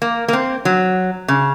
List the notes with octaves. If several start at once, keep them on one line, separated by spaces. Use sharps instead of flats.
A#3
A#3
C4
F#3
C#3